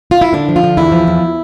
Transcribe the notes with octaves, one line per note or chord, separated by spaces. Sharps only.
F4
E4
D3 D4
F3
F4
D3
E2 E4
F3
E2